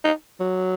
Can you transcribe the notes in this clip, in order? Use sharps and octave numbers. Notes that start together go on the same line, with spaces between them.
D#4
F#3